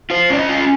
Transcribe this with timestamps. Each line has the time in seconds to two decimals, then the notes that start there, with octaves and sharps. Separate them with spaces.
0.10 F4 C5
0.30 C#4 D5
0.39 D#5
0.49 F4